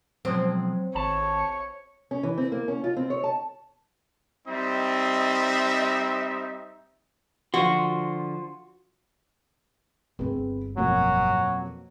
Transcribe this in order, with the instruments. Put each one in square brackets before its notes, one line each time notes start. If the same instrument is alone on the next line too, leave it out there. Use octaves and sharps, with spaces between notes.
[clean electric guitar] B2 F3 G#3 [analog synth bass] F#3 [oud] C4
[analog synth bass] G#1 [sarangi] C#5 [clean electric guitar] A5
[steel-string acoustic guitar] C#4
E3
C4
A#3
C#4
F4
C4
C#5
A5
[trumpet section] G3 C4 D#4 D#5 E5
[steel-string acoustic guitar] D3 F3 C5 [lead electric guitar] F4 C6 [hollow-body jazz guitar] F#4
[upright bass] G1 G2 [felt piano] C4 G#4 B4
[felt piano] F2 B2 A#3 [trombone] F#3